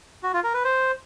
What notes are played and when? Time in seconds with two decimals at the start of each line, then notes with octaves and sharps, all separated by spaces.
0.23 F#4
0.33 F4
0.44 A#4
0.54 B4
0.64 C5